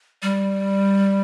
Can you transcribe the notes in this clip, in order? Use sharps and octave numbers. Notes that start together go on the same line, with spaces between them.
G3